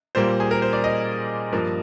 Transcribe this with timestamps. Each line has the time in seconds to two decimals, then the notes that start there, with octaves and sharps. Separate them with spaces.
0.15 A#2 G3 A#3 C5
0.40 G#4
0.51 A#4
0.62 C5
0.73 D5
0.84 D#5
1.53 G2 F3 A#3